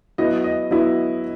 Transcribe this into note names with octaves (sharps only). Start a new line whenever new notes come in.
F#3 B3 E4 D#5
D#5
F#3 B3 E4